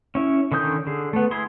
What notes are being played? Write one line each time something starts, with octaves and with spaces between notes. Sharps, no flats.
C#4 E4
D3 D#3 C#4 D#6 G6
D3 G#4
A3 B3
E4 G#4 C6